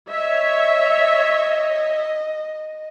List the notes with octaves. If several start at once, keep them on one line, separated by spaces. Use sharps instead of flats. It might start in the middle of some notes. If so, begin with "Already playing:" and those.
C#5 D#5 E5